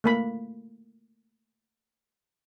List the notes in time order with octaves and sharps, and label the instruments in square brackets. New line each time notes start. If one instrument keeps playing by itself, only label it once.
[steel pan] A3 A#3 B5